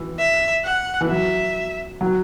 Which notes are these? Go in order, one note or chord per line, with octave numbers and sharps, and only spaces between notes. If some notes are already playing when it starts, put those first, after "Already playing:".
Already playing: E3
E5
F#5
E3
F#3 E5
F#3